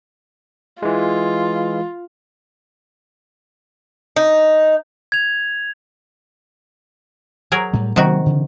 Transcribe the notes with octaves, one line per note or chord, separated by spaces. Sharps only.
E3 G#3 F4
D#4
G#6 F7
F#3 G#4 A#4
A2 G3
C3 D#3 F#3 A#3 B3 F#4
C#3 E3 F3